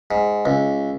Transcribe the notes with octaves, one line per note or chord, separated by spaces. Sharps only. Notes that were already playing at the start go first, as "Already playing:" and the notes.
G#2
C#2